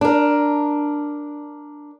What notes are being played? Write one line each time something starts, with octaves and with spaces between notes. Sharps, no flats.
D4 A#4